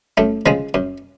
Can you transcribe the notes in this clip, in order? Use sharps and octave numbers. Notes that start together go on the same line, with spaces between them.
F#2 A3
C#3 F3 G#3
F#2